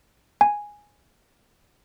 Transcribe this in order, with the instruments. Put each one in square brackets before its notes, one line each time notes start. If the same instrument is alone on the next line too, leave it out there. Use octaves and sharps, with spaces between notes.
[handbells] G#5